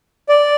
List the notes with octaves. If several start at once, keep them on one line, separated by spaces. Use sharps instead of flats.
D5